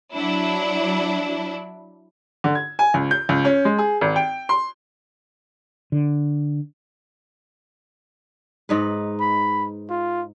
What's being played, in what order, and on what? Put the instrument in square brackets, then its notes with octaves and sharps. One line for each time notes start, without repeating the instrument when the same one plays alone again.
[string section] F#3 D4 E4
[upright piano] D3
G#6
G#5
C#2
G6
C#2
C#4
G#3
G#4
G#1
G5
C6
[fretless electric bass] D3
[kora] G#2 D#4 B4
[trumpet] B5
F4